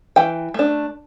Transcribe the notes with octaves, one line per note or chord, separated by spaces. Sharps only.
E3 G5
A3 D4